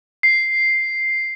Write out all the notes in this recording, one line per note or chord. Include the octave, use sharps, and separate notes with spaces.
C7